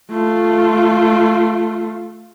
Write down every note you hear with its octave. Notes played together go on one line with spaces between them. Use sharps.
A3 F4